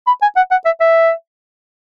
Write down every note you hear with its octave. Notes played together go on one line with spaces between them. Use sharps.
B5
G#5
F#5
F#5
E5
E5